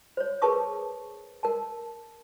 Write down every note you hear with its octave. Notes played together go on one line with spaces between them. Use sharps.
C5 C#5
G#4 A#4 B4 A5 C#6 D#6
A#4 A5